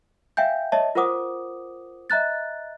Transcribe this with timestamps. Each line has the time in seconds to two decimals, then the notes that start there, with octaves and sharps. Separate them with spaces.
0.37 E5 F5 G5 G#5 G6
0.72 C#5 D#5 E5 A5
0.95 F4 A#4 C5 F#5 D6 D#6
2.10 D#5 E5 A#5 F#6 A6